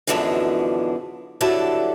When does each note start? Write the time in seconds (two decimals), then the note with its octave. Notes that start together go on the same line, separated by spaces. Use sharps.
0.07 F#2 B2 D3 E3 F3 G#3
1.41 G2 D3 F#3 E4 A4 D5